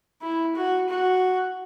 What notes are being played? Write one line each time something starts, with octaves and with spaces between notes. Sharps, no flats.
E4
F#4
F#4